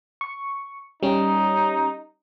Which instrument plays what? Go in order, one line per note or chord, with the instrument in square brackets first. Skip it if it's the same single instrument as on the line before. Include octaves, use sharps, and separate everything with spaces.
[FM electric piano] C#6
[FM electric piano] G3 C#4 [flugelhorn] D#4